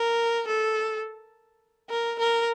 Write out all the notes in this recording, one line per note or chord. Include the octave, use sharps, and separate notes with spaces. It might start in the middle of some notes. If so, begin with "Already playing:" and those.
Already playing: A#4
A4
A#4
A#4